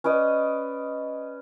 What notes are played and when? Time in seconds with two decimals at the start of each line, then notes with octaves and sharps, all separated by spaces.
0.04 C#4 B4 D5 D#5